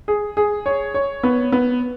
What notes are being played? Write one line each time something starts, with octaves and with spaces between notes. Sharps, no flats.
G#4
G#4
C#5
C#5
B3
B3